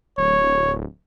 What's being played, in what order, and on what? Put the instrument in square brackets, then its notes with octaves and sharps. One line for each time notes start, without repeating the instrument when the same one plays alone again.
[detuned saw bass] D1 [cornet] C#5